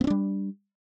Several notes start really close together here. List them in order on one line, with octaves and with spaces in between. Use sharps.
B3 C4 D4 G3